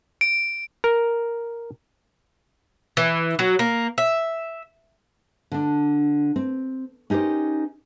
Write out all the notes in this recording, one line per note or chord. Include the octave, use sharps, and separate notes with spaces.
D7
A#4
E3
F#3
A#3
E5
D3 D4
C4
C#4 D#4 G4 A#4 C5